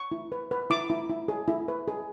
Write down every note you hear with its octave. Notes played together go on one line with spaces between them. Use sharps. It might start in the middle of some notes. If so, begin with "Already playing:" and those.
Already playing: C#6
E4
B4
B4
E4 D6
E4
E4
G#4
E4
B4
G#4